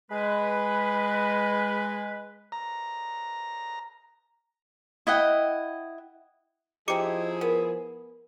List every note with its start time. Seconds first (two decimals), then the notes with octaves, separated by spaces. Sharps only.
0.10 G#3 B4
2.52 A#5
5.07 E4 D#5 F#5 G5
6.88 F3 C4 D#4 E4 G4 G#4 D6 C#7
7.41 B3 A#4